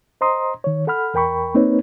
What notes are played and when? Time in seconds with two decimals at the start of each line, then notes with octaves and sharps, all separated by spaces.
0.21 C5 D#5 A#5 C6 D#6
0.64 D#3 C#5
0.87 A4 F#5 B5 F6
1.14 E2 A#4 G5 B5 C#6
1.55 A#3 C4 D#4 B4 C#5